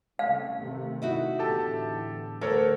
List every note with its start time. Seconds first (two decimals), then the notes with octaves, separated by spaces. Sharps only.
0.19 C2 C#3 A3 F5
0.59 C3 D#3 A3
1.02 D#4 E4 F#4
1.39 E2 A2 D3 G4 A4 A5
2.41 D2 A4 A#4 C#5